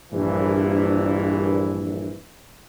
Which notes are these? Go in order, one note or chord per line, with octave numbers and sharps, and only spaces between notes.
A#1 G2 E3